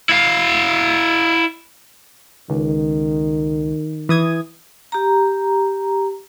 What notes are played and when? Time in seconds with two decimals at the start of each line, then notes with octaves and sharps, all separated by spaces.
0.09 E4 F5
2.50 C#2 D#3
4.09 E3 D#6 G#6
4.92 G4 A#5